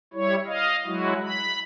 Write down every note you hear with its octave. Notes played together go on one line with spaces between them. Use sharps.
G3 E4 C#5
D#5 F5
F#3 G#3 E4 F#4
B5